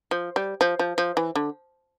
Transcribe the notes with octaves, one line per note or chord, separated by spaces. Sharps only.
F3
G3
F3
F3
F3
E3
D3